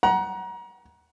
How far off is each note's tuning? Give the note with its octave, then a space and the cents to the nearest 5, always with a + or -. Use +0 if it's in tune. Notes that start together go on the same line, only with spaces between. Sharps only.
F#5 +15 A#5 +30